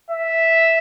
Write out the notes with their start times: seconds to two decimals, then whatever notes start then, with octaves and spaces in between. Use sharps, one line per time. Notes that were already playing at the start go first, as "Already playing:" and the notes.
0.10 E5